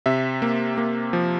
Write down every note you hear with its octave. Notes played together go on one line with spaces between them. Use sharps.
C3 E5
A#3
A#3
F3